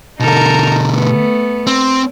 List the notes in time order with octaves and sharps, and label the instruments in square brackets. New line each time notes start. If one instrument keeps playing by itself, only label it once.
[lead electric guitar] B2 D3 [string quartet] D#4 A4 A#4
[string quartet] A3 B3
[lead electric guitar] C4